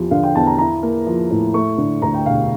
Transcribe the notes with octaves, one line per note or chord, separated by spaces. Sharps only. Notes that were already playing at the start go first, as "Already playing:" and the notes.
Already playing: E2 F3 G4
D3 F5
G5
E2 A5
A#5
E4 A#5
A#3
F3
A2
A3 C#6
D3
D2 A#5
G5
E1 F5